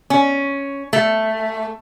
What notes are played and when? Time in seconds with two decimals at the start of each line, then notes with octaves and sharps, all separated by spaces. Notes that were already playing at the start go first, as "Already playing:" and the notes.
0.10 C#4
0.93 A3